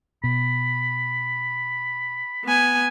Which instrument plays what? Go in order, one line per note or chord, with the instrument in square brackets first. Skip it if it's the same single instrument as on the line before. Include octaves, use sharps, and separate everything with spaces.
[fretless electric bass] B2 [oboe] B5
[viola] B3 G#5